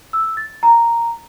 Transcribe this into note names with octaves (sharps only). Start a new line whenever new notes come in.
E6
A6
A#5